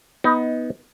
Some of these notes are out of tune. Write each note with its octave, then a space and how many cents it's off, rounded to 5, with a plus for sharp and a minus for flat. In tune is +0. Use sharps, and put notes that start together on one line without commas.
B3 +0 D#4 +20